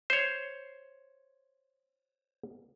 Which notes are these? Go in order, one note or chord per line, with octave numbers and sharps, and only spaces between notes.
C5 C#5